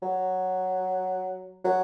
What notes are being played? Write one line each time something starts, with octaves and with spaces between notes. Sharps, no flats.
F#3
F#3